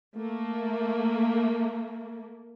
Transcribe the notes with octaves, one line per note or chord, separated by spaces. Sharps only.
A3 A#3